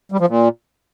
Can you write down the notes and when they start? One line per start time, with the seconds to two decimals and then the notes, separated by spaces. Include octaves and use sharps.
0.12 G3
0.20 F3
0.29 A#2